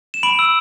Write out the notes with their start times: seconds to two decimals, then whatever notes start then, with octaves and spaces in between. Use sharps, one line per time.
0.14 E7
0.23 B5 D7 F#7
0.39 E6